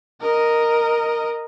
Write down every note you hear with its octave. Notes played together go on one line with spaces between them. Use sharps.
A#4 D#5